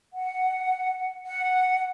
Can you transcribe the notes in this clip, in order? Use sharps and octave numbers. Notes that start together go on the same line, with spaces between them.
F#5
F#5